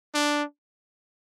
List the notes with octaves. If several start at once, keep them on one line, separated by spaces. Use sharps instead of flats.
D4